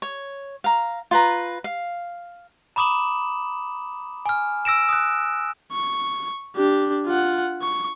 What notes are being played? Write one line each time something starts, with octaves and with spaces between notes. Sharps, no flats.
C#5
F5 A#5
F4 B4 A#5
F5
A#5 B5 D6 D#6 E7 F#7
G#5 F6
E6 A#6 D7 E7
D#6 F#6
C#6
D4 G4
F4 F#5
C#6